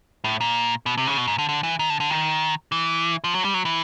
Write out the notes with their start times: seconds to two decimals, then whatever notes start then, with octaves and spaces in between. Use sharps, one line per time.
0.24 A2
0.41 A#2
0.86 B2
0.98 C3
1.07 C#3
1.17 B2
1.27 G#2
1.38 D3
1.49 D3
1.63 E3
1.79 D#3
1.90 D3
2.00 D3
2.10 D#3
2.72 E3
3.24 F3
3.35 F#3
3.45 G3
3.54 F#3
3.65 E3